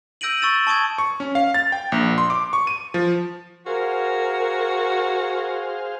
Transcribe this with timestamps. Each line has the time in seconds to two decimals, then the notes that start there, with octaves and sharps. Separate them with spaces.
0.21 E6 G6 A#6 D7 D#7 F#7
0.42 C#6 E6 A6 E7
0.67 A5 C#6 D#6 G#6
0.98 C#6
1.20 C#4
1.35 F5
1.54 A6
1.72 G5
1.92 A#1
2.18 C6
2.30 D6
2.53 C#6
2.67 D#7
2.94 F3
3.66 F#4 G#4 A#4 C5 F5